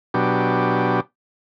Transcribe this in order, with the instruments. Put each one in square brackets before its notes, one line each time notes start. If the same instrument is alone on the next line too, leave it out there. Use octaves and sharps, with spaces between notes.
[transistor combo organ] B2 F#3 D4 G4